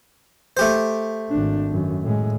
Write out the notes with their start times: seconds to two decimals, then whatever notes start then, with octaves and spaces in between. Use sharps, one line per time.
0.57 A3 G4 C5
1.30 G#1 D4
1.70 F#2 D#3
2.04 A2 G#3